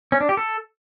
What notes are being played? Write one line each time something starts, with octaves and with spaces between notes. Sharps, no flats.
C#4
D4
G4
A4